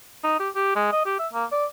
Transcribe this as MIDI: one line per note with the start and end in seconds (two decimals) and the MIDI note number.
0.24 0.37 63
0.40 0.49 67
0.55 0.75 67
0.76 0.89 56
0.92 1.04 75
1.06 1.15 67
1.19 1.28 76
1.33 1.45 58
1.52 1.66 74